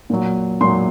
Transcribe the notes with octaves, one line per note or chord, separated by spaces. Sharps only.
A#2 F#3
A#2 F#3 C6